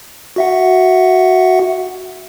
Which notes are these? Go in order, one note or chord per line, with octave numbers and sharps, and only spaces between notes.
F#4 E5 F#5